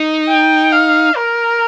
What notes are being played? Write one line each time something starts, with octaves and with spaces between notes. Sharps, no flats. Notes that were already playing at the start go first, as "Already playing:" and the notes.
Already playing: D#4
G5
F5
A#4